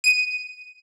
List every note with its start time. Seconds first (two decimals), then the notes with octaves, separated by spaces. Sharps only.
0.04 D#7